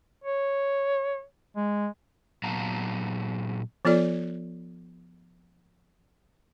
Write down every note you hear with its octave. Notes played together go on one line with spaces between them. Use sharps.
C#5
G#3
A#2 F#3 B3 F5 A5 A#5
F3 B3 F4 A4 D5